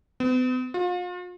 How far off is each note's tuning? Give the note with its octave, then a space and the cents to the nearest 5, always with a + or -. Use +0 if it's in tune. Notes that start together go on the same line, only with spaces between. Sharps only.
B3 +45
F4 +40